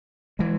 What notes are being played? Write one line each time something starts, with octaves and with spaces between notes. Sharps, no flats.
E3 G#3